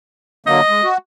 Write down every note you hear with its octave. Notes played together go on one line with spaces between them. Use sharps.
D3 F#3 A#3 D#5
G#3
F#4